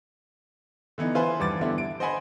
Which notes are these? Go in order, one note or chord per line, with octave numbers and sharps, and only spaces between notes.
D3 E3 B3 D#4
E4 F4 B4 C5 G#5
E2 G2 D6 A6
D3 B3 D4 E4 G4
D7
C5 D#5 F#5 G#5 B5